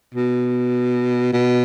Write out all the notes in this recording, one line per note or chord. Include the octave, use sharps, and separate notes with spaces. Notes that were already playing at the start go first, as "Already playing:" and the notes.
B2
B2